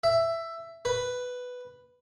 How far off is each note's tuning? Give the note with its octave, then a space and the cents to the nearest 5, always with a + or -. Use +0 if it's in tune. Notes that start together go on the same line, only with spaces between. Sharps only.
E5 +10
B4 +5